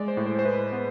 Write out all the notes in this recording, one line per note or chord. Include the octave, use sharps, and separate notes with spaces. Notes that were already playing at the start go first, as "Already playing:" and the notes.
Already playing: G#3 D5
C5
A2
C5
C5
A2 B4
B3